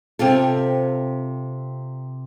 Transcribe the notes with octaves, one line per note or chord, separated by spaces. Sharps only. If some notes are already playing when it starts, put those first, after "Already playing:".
C3 C4 F4 A4